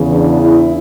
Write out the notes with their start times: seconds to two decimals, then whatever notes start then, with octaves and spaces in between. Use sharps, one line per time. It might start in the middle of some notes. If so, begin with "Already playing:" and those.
Already playing: E2 C#3 E3
0.12 D4
0.43 E4